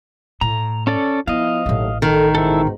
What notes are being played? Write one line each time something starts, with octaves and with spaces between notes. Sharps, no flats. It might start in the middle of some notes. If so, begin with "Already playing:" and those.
A2 A#5
C#4 A4 D5
F3 B3 E4 D#5 F5
A1 D#2 A2 F#3 A3
D#3 A4
G#2 B2 E4 A4